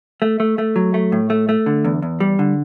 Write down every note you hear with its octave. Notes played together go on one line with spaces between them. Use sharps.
A3
A3
A3
F#3
A3
A2
A3
A3
D3
E2
E2
G3
D3